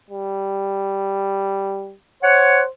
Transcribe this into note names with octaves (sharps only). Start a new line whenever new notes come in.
G3
C5 C#5 F#5